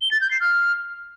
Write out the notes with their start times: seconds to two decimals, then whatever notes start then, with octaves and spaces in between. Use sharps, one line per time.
0.01 G7
0.11 A6
0.21 G6
0.31 C7
0.41 F6